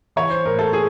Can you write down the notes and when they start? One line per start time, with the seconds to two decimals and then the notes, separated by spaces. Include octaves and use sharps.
0.16 E3 C#5
0.30 C5
0.45 A2 A#4
0.59 A4
0.73 G#4